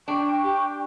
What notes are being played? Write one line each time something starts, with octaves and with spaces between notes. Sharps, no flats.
D4 G5 C#6
G4